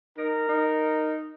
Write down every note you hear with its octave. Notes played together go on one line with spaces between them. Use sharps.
D#4 A#4
D#4